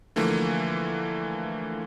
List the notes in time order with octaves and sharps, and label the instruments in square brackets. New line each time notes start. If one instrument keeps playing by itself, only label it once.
[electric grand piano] D3 E3 F3 A3 A#3